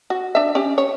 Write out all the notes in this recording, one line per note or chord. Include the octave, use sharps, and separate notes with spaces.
F#4
D4 E5
C#4 G4
C#5